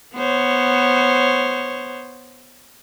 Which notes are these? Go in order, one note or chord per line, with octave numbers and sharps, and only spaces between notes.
B3 C5 C#5